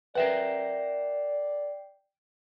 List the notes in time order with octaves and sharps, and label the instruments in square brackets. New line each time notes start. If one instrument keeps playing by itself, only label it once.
[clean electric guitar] A#4 E5 F#5 [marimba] B4 [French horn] D5 [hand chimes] G5 C7